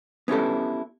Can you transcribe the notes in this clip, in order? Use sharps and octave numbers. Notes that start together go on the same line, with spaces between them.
B3 C#4 E4 G4 A4